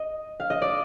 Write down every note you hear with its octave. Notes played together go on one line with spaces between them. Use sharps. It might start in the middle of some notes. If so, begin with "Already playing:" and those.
Already playing: D#5
F5
D#5
D5